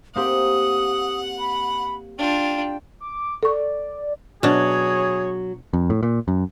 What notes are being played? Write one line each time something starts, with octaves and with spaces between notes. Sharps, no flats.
A#3 C4 G4 F#5 D#6
B5
D4 F4 G5
D6
A4 D5 C#6
B2 F#3 D4 G#4 C#5
F2
A2
A#2
F#2